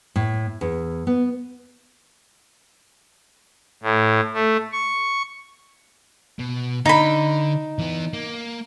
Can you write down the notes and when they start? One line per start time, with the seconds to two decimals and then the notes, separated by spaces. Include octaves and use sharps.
0.16 A2
0.61 E2
1.07 B3
3.83 A2
4.34 A3
4.73 C#6
6.39 B2
6.86 D3 D#4 B5
7.79 E3 B3
8.13 A#3